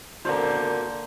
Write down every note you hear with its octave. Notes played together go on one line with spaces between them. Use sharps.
D3 A#3 F4 F#4 A#4 C5